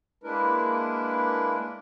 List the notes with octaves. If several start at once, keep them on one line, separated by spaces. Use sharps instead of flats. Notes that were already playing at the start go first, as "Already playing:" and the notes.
G#3 A#3 D4 E4 A#4 B4